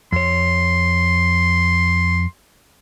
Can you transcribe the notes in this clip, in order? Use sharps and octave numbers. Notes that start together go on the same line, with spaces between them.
F2 C#5 C6